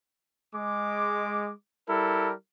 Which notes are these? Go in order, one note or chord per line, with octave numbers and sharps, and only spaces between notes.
G#3 D6
G3 E4 A4 A#4